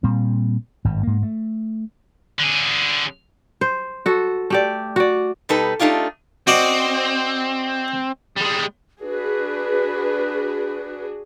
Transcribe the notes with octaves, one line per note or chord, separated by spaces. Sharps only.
A#2 G3 C4
G#1 G2
G#2 A#3
A3
D3 G#4
C5
F#4 A4
A3 G4 D5
F#4 D5
B2 G3 D#4 A4 B4
A3 D4 D#4 F4 G4
C4 F#4 D5 D#5
G3 G#3
D4 F#4 G#4 B4